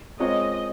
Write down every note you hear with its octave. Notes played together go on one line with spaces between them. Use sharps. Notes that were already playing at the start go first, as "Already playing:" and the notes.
G#3 C4 F4 A#4 C#5 D#5